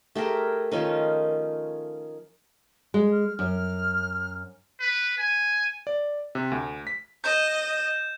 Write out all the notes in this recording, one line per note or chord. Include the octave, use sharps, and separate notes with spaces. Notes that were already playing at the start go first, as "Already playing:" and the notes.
A3 G4 G#4 A#4
D#3 F3 C#4 D#4
G#3 G#5
F6
F#2 F6
B4
G#5
D5
C3
D2
B6
D#5 G6 E7